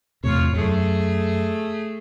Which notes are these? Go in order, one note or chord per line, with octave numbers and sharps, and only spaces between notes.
E2 A2 C3 F4 C#5
F#2 A3 G#4